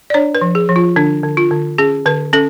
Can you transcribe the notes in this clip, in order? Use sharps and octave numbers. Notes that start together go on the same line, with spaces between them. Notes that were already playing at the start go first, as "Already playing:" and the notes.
D5
D4 C#5
B4
F3
G#4
F3
F4
D3 D4
D3
F4
D3
C#4 G#4
D3 B4
C#4 A4